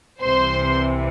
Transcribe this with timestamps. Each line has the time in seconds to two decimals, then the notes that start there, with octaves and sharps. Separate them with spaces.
0.21 C2 C3 E3 C5 C6